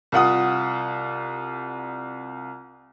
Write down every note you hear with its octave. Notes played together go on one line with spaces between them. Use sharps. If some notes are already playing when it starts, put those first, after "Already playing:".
C2 F4 F#5 D#6